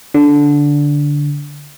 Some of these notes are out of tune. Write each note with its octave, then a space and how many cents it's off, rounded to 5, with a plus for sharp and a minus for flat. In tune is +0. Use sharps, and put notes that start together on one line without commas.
D3 -10